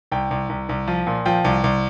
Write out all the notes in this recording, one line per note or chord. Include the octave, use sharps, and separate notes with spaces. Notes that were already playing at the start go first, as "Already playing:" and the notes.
C2 G5
C2
C2
C2
F3
A#2
F3 G5
C2
C2